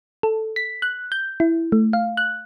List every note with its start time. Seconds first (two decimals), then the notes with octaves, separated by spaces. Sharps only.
0.23 A4
0.56 B6
0.82 F#6
1.12 G6
1.40 E4
1.72 A3
1.93 F5
2.17 F#6